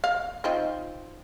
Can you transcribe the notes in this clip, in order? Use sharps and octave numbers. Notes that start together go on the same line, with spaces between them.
F5
C4 D#4 F4